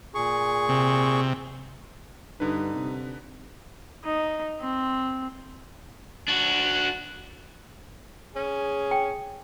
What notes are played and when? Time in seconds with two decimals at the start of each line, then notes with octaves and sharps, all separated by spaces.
0.15 A#2 G#4 C#6
0.69 C3
2.40 G2 D3 D#4 B4
2.75 C3
4.04 D#4
4.61 C4
6.28 D4 F#4
8.36 C#4 G#4
8.91 G5